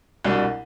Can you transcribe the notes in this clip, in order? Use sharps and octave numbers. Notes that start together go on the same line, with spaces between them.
C2 B2 G3 D4